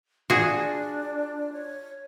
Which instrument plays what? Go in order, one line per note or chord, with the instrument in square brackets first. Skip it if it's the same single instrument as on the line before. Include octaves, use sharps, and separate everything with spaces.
[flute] D4 [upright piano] F4 [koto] F#4 G#4
[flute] C#5